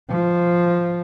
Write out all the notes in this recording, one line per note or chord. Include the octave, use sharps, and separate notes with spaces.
F3